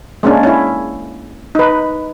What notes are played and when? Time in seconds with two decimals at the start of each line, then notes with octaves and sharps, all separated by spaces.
0.23 G#3 A#3 C#4 D4
0.43 C#4 E4
1.55 D#4 B4